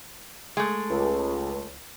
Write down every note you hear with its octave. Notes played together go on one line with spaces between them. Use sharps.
G#3 A3
C#2